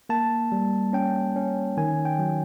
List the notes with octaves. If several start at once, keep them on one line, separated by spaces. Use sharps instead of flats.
A#3 A5
G3
C#4 G5
C#4
D#3 G#5
G5
F#3